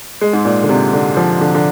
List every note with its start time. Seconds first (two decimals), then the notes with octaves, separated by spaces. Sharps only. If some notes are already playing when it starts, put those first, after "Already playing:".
0.21 G#3
0.33 G#2
0.45 A#2
0.63 D3
0.69 C3
0.93 D3
1.17 F3
1.41 D3
1.55 D3